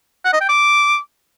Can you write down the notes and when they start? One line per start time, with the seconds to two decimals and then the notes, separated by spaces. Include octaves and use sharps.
0.25 F#5
0.33 D#5
0.41 G5
0.49 D6